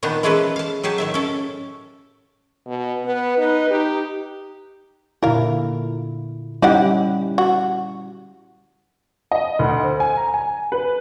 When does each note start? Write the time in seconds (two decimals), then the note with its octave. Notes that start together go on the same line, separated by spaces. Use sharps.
0.03 A#2 D#3 B3 D4 D#4
0.23 E3 G#3 C#4 G#4 A4 B4
0.56 F5 A5
0.83 F#3 G4 G#4 A5
0.98 A2 D#3 E5
1.14 C#4 A4
2.66 B2
3.04 B3 B4
3.37 D#4 B4
3.70 D#4 G4
5.23 A#2 D3 E4 A#4 F5
6.62 G3 C#4 D#4 E4 G4 F#5
7.38 F#4
9.31 D#5
9.59 D2
9.83 C5
10.00 G#5
10.17 A#5
10.34 G#5
10.72 B4